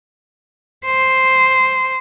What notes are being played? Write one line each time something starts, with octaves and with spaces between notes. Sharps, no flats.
C5